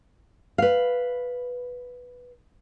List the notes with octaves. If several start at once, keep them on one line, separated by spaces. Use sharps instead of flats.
B4 F5